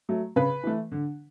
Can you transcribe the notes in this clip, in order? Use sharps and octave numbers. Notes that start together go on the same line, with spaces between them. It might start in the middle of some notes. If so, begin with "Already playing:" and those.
F#3 A3
C#3 B4
E3 A3
D3